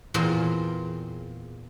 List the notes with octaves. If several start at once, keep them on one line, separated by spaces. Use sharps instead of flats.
E2 A#2 C4 G#4 A#4 C6